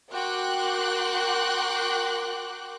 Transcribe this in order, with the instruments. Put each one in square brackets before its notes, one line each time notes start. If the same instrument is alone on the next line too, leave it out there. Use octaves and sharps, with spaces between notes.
[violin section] F#4 A#4 G5 C6 D6 F#6